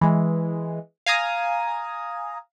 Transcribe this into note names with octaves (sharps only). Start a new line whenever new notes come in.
E3 G#3
F5 G#5 A#5 D#6